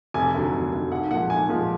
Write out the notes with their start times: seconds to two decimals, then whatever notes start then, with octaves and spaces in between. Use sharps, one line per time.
0.14 F1 G#5
0.34 D#2 D3 F#3
0.53 F1
0.72 D#2 D3 F#3
0.91 B1 F#5
1.11 A#2 F3 G#3 F#5
1.30 B1 G#5
1.49 A#2 F3 G#3